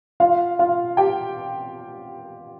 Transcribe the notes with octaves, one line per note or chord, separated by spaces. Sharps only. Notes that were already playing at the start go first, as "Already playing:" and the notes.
F4 F5
F4 F5
G4 G5